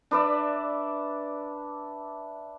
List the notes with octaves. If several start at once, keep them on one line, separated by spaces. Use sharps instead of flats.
D4 B4 D5 E5